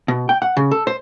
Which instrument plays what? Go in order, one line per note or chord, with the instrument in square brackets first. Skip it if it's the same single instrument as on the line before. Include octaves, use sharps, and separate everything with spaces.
[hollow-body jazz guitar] B2
G5
F#5
C#3
A4
C5